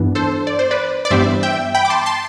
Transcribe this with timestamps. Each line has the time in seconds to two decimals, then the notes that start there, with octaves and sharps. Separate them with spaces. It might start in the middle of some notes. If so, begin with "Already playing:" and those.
Already playing: G2 E3 B3 D4
0.15 A4 C5
0.47 D5
0.59 C5
0.71 B4 D5
1.05 D5
1.11 G2 E3 G3 B3 C5 E5
1.43 E5 G5
1.74 G5 B5
1.85 D6
1.90 A5 C6
2.06 A5 C6